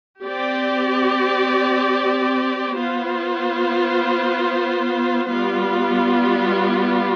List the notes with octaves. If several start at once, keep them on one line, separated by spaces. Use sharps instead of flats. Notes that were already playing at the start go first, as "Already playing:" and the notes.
C4 G4 D5
B3 F4 C5
G3 B3 F4